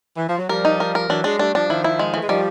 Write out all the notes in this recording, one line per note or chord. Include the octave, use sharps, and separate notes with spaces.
E3
F3
F#3
F3 G3 A#4
D#4
A#4
A#4
E3 F#3 D4
F#3 G#3 D4
G3 A3 D4
F3 G3 D4
D#3 F3 E4
E4
G#3
E3 A3
G#3
D#3 F3 G3